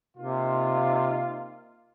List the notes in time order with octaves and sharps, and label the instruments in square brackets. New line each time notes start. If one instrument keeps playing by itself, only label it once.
[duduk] C3 [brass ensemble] A#3 D#4 F4